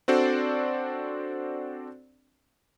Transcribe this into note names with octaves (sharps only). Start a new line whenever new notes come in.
C4 D4 F#4 A4 C5 D5